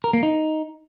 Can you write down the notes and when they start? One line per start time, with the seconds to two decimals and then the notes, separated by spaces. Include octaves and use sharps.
0.04 A#4
0.13 A#3
0.23 D#4